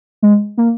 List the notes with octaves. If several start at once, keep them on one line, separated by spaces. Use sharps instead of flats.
G#3
A#3